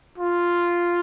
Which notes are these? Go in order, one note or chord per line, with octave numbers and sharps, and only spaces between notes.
F4